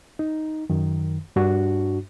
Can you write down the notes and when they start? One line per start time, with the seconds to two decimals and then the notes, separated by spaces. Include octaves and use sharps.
0.19 D#4
0.70 F#2 D#3
1.36 G2 D4 F#4